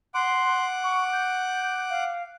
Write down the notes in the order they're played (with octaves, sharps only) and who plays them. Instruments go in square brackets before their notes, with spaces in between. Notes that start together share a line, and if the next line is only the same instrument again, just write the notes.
[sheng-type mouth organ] F#5 D6 [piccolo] C6
[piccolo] C#6
G6
F5